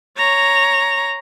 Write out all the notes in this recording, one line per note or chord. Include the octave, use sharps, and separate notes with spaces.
C#5 A#5